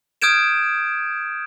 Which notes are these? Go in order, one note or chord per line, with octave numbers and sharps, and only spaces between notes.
D#6 F6 G6 G#6 D7 E7